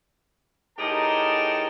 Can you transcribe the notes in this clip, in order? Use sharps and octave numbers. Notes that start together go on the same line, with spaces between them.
A2 D#4 G4 G#4 A#4 A5